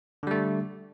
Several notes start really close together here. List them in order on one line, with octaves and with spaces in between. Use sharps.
D3 G3 A3